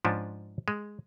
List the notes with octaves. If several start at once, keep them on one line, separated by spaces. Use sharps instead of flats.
G#2 F3 C#4 D4
G#3